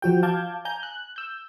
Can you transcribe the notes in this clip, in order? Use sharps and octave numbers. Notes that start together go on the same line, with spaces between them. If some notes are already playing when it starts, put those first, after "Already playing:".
F3 F#4 G5
F5 A5 D6 G6 G#6
G#5 A#5 G6
F#6
E6 G6